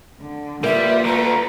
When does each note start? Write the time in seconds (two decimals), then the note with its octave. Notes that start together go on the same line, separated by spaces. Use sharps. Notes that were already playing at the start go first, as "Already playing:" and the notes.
0.20 D3
0.64 G3 A#3 F4 B4 E5
1.05 D3 A3 A#5